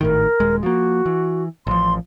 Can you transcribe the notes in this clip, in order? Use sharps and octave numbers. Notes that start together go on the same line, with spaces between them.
G#1 A2 D#3 A#4
D#1 G#3
F3 A#3 F#4
E3
A1 F3 C6